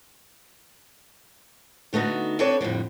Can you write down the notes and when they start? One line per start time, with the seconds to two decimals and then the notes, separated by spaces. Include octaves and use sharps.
1.93 D3 A3 B3 D#4 F#4
2.39 C4 D4 A4 B4 C#5 D5
2.61 F2 A2 D3 G3